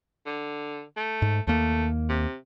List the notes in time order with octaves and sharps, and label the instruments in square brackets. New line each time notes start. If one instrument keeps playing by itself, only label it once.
[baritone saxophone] D3
A3
[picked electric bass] G#2
[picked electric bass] D#2 A#3 [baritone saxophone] A3
[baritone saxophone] C3